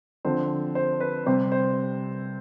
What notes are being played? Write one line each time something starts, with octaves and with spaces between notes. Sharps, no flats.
D3 F3 C4 C5
C5
B4
C3 G3 C4 C5
C5